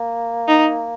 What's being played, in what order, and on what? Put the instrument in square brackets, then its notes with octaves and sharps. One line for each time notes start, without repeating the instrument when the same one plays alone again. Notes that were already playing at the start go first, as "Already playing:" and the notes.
Already playing: [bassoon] A#3
[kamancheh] D#4